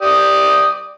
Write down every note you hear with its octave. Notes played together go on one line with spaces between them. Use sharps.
G4 D5 D#6